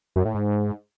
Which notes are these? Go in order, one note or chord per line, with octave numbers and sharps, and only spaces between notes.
F#2
A2
G#2